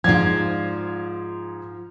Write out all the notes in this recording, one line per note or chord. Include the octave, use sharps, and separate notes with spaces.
G#2 F3 F4 D5 G#6